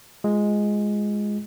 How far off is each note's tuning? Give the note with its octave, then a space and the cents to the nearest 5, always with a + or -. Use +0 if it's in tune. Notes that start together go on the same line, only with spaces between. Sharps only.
G#3 +0 F4 +0